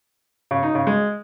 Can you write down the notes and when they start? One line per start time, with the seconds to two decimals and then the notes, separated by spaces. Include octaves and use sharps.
0.51 C#3
0.63 D#4
0.75 C#3
0.87 G#3